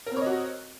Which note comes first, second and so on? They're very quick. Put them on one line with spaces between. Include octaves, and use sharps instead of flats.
A#4 C4 C#5 D#5 F#4